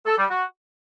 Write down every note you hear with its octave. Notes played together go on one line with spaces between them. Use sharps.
A4
G3
F#4